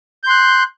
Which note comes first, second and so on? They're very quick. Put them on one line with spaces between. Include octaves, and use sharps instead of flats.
G6 C6 F#6